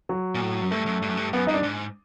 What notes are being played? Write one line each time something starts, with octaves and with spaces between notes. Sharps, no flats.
F#3
A#2
A2
F#2
G2 A3
F#2
G2
F#2
G2
F#2 B3
G2 D#4
D4
G#2